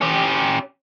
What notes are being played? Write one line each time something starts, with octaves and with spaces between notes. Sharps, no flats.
C#4 G4